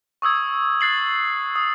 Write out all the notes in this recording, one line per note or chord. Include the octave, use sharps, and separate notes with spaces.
C#6 D#6 E6 G#6
F#6 A6 C7 F#7
D#6